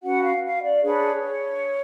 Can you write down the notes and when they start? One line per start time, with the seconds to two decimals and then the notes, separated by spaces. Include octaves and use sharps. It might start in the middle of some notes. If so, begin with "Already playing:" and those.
0.02 C#4 F#4 B4 F#5
0.22 F5
0.43 F5
0.63 D5
0.83 D4 G#4 B4 C#5